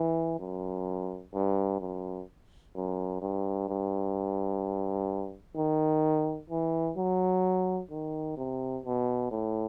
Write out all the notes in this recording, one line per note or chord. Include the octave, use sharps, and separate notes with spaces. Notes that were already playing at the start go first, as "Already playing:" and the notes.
Already playing: E3
F#2
G2
F#2
F#2
G2
G2
D#3
E3
F#3
D#3
C3
B2
A2